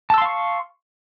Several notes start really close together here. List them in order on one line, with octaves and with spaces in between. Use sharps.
A5 E6 C6 F5 C#6